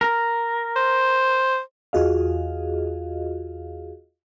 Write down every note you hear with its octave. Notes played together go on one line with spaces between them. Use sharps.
A#4
C5
E2 F4 F#4 G#4 D#5 F5